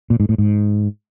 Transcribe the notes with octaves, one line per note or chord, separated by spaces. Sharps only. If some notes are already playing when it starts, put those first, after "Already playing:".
A#2
G#2
A2
G#2